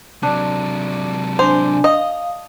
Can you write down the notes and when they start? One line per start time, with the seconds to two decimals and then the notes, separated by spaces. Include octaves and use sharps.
0.23 C3 F#3 D4
1.39 D4 C5 G#5
1.84 D#5 F5 D#6